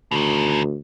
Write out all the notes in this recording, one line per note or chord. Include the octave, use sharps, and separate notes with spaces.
D2 B2 D#3